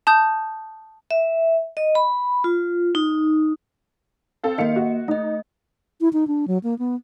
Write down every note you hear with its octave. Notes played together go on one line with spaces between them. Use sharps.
A5 D#6 G6
E5
D#5
B5
F4
D#4
C4 A4 F5
D#3 A#3 D#5 F5 C#7
F#4
A3 D#4 D#5
E4
D#4
D4
F#3
A#3
B3